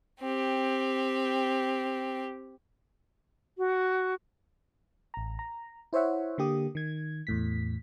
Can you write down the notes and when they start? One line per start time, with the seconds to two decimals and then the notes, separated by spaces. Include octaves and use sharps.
0.21 C4 G4
3.57 F#4
5.14 A1 A#5
5.39 A#5
5.93 E4 C5 C#5 E5 F#5
6.38 D3 A#3 G4 D#6
6.75 D#3 G#6
7.27 E2 A2 B6